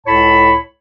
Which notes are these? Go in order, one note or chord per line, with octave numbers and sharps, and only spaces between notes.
C#2 A2 A4 C#5 A5 B5